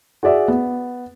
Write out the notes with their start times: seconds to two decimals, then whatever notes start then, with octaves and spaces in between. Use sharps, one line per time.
0.23 F#4 G#4 D5 E5
0.48 B3